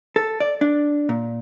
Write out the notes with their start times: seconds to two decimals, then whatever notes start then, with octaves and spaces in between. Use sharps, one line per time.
0.16 A4
0.40 D5
0.61 D4
1.09 A#2